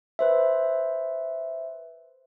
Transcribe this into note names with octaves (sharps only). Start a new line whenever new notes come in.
B4 C5 E5